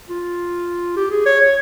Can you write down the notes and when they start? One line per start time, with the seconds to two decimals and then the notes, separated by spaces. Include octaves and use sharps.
0.09 F4
0.97 G4
1.11 G#4
1.26 C#5
1.41 C#5